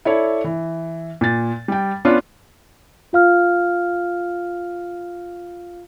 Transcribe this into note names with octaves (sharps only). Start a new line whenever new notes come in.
E4 A4 C#5 D5
E3
A#2 A6
G3 G5
B3 C#4 D4 F4 D5
F4 F5 F6